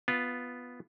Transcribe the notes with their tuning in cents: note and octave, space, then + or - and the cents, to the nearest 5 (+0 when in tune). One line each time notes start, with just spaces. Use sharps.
B3 +0 F4 +0